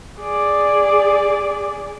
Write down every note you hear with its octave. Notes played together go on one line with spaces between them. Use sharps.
G#4 D5